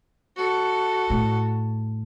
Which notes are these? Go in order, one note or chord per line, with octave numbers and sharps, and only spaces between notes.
F#4 A4
A2